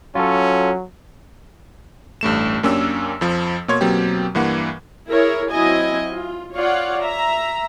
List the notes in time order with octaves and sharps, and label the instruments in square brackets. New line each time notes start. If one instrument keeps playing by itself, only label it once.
[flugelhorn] F#3 [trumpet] C#4 [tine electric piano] F4 A4
[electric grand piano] A1 G2 A3 E7
F#2 A#3 C#4 D4 G4 E6
F2 F3
B2 A#3 C#5 C6 G#6
B2 F#3 A#3 C4 G4
G2 E3 A#3 F#5
[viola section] E4 G#4 A#4 C#5
F#3 C4 E4 F#4 D#5 G#5
F4
F4 C#5 D5 F5 F#5
E5 A#5